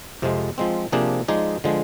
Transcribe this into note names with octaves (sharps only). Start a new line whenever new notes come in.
F2 C3 F3 G#3
F3 G#3 C4
C3 F3 A#3 D4 G#4
F3 G#3 D#4 G#4 D5
D3 F3 G#3